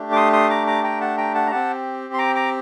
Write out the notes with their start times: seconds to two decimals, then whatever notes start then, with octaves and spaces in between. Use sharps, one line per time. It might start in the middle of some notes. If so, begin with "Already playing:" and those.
Already playing: A3 D4 G4
0.12 D6
0.16 C6 D#6
0.33 C6 D#6
0.49 A#5 D6
0.67 A#5 D6
0.84 G5 A#5
1.01 F#5 A5
1.17 G5 A#5
1.35 F#5 A5
1.47 A#5
1.51 C4 G4 F#5 A5
2.14 C6
2.18 A#5 D6
2.35 A#5 D6